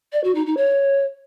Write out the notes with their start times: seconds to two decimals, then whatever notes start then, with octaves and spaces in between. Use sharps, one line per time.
0.12 D5
0.23 F#4
0.35 D#4
0.46 D#4
0.57 C#5